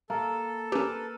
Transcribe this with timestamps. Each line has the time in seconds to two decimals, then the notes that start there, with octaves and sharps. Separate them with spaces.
0.10 A#3 A4
0.72 C#4 G4 A#4 B4